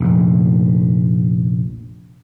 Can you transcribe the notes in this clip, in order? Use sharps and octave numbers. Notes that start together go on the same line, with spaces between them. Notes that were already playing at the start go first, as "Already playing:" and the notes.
F1 A#1